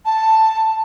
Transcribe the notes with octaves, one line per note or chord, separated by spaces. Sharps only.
A5